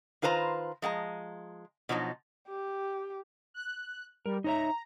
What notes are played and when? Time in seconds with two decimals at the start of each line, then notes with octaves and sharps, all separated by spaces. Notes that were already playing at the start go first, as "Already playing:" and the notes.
0.22 D#3 F4 B4 C5 A#5
0.82 F3 G#3 F#5 A#5
1.89 B2 F3 F#3 D#4
2.49 G4
3.54 F#6
4.26 G3 A#4
4.44 D#4 C#5 E5 A#5